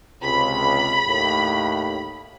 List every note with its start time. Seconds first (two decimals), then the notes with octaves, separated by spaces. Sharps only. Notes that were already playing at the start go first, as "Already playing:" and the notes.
0.22 C#2 C3 B5
1.07 D#2 A2